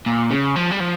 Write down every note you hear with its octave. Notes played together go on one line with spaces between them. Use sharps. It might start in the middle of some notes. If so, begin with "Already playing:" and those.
A#2
C#3
F3
G3
F3